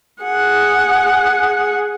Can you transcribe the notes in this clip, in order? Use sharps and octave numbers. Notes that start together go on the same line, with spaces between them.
G#4 F#5